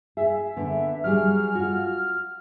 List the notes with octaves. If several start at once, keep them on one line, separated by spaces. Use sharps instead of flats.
G#4 E5
D3 B3
F#3 G3 G#4 F6
F4 F#4